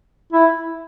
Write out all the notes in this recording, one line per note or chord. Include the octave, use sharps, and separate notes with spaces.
E4